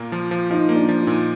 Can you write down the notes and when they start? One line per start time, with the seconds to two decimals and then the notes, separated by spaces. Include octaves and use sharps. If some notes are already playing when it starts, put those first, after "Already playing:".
Already playing: A#2 A#3
0.12 F3
0.31 F3
0.50 F3 D#4
0.69 A#3
0.75 D4
0.89 F3
1.01 D#4
1.07 A#2